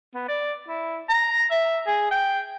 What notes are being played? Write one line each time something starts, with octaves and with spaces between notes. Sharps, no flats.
B3
D5
E4
A#5
E5
G#4
G5